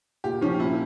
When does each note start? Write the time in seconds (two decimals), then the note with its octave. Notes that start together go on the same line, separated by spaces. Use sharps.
0.24 A#2 G4
0.41 F3 C#4
0.59 A#2 E4